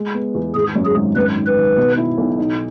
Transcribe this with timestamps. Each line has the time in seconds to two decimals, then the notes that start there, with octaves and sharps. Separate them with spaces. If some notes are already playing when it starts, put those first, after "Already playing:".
Already playing: G#3
0.14 B3
0.35 E2
0.54 G#1 G#4
0.76 F#2
0.85 G#4
0.95 G#1
1.15 F#2 B4
1.36 D#3
1.46 B4
1.56 D#3
1.77 B2
1.97 E4
2.18 B1
2.38 D#4